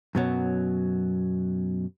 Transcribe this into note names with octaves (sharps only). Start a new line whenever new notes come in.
F#2 B2 F#3